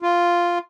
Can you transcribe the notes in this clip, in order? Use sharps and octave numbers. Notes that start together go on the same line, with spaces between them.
F4